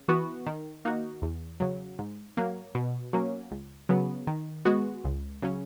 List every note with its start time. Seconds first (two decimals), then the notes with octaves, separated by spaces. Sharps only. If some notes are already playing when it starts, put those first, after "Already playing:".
Already playing: C#3
0.08 E3 B3 F#4
0.46 D#3
0.85 A#3 D#4 F#4
1.22 E2
1.60 C#3 F#3
1.99 G#2
2.37 F#3 A#3
2.75 B2
3.13 F#3 A#3 C#4
3.51 C#2
3.89 C#3 F#3 B3
4.27 D#3
4.65 G#3 B3 F#4
5.04 C#2
5.42 C#3 F#3 C#4